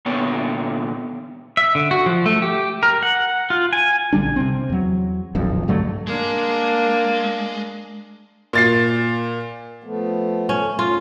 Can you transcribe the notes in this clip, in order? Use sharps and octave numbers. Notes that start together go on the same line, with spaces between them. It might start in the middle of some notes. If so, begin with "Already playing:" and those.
A#2 D3 B3 C#5 G5
E5
D3
F#4
F3
A3
G4
A#4
F#5
F4
G#5
A#1 D3 G3 D4
C3 C4
E2 F#3
D#1 B1 F2
G2 D3 F#3 A3
G#3 A#3 D4
A#2 A6 C7
F3 A3 B3
C#4
A3
F4